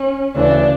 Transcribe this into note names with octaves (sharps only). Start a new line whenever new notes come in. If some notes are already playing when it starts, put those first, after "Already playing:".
Already playing: C#4
D2 C#3 E3 D4